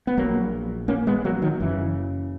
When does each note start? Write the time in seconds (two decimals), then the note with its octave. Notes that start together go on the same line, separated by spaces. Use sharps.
0.07 B3
0.17 A#1 A#2 F#3 A#3
0.88 A#3 C#4
1.07 G#3 B3
1.24 F#3 A#3
1.42 D#3 F#3
1.60 F#1 F#2 C#3 E3